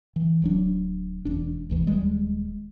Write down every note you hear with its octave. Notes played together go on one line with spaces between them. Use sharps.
E3
D1 F#3 D4
E1 D4
F1 D2 E3
D#1 G3 G#3